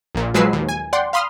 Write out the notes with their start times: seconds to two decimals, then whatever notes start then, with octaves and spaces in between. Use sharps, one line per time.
0.15 A#1 A#2
0.34 F3 F#3 G#3 B4 E6 C7
0.53 D#2
0.69 G#5
0.93 D5 F#5 G5 C6
1.13 F5 B5 C6 D#6 F6